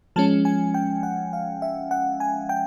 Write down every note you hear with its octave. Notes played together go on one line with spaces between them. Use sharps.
F3 G#3 C#4 A5
G#5
G5
F#5
F5
E5
F#5
G#5
G5